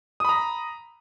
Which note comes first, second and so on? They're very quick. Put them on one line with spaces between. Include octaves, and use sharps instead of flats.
D#6 B5 A#5